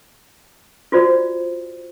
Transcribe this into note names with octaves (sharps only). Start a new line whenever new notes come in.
F4 F#4 C5 D5